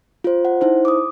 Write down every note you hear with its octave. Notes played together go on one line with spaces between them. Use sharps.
F4 C5
F#5
D#4 E4 C5
D6 D#6